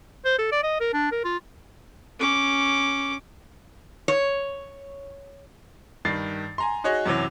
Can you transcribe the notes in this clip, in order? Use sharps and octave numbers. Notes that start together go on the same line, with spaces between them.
C5
A4
D5
D#5
A#4
D4
A#4
F4
C#4 D6
C#5
G2 D#3 A6 C7
G#5 A#5 C6
D#4 F#4 G#4 C#5 D#5
F#2 C3 E3 F#3